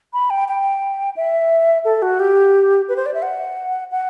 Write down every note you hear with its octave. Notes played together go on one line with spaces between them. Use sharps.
B5
G5
G5
E5
A4
F#4
G4
B4
C5
D5
E5
F#5
F#5